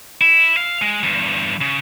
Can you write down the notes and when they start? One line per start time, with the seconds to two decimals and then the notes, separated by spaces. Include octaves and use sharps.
0.21 E4
0.57 F5
0.82 G#3
1.03 E2 G2
1.61 C#3